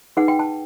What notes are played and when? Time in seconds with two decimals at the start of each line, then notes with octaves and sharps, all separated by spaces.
0.17 D#4 G#4 B4 F#5
0.28 G5
0.39 A5